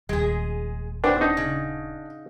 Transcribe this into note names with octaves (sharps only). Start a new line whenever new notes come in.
D#1 G#3 G#4
D4 F#4 B4 C5 G5
D4 D#4
C#3